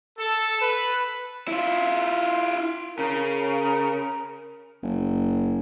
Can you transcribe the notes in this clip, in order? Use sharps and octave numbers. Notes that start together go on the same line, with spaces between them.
A4
B4
E4 F4
C#3 A#4
F#1